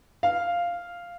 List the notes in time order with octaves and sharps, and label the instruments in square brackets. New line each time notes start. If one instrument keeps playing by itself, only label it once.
[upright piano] F5